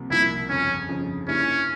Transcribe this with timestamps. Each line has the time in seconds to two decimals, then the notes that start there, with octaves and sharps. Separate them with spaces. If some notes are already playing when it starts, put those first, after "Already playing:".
Already playing: C2 C3 F3 A#3
0.10 C2 C3 F3 A#3 E4
0.49 G1 F2 C#3 C#4
0.88 G1 F2 C#3
1.28 G2 G3 A#3 C#4 E4